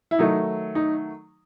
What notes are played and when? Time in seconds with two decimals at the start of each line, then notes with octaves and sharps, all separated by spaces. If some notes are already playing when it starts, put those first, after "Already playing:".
0.11 E4
0.19 D#3 F#3 A3 D#4
0.75 D#4